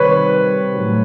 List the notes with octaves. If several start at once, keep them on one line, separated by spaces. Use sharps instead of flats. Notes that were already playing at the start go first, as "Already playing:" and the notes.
Already playing: C3 D#3 G3 C4 B4 C#5
A2 F#3 A3